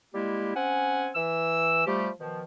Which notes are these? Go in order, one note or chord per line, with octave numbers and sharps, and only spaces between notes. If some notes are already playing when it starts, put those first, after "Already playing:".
G3 G#3 A#3 E4 G4
C4 C#4 F#5 G#5
E3 E6
F3 G3 A3 G4
B2 D#3 F3